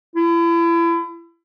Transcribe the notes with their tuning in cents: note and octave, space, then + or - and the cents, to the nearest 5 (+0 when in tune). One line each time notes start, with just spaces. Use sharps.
E4 +35